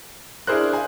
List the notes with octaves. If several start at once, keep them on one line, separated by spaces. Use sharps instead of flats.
D4 E4 G#4 A#4 C5 F#6
F5 G#5